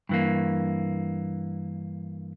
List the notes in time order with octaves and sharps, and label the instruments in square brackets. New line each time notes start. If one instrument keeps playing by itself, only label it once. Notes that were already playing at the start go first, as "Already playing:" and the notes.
[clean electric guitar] G2 E3 A#3